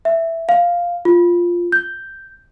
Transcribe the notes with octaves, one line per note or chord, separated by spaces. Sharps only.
E5
F5
F4
G6